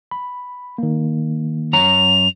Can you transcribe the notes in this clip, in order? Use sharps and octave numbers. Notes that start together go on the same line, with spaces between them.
B5
D#3 A#3
F#2 C#5 A#5 F7